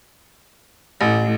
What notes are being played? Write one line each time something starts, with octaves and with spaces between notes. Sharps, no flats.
A1 A2